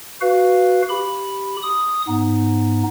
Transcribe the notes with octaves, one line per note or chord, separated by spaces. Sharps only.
F#4 B4 F5
G4 B5
D#6
G#2 B3 D#4